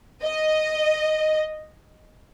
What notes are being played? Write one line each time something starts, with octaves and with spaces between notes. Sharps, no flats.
D#5